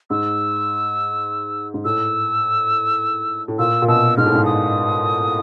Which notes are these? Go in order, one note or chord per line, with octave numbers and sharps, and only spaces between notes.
G#2 E6
G#2
A2 E6
A2
A#2 E6
A#2
B2 E6
G#2 F6
A2
G#2
D#6